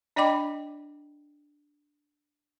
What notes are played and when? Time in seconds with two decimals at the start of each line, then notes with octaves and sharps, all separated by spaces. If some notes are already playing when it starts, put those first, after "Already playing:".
0.16 D4 D5 D#5 G5 B5 D6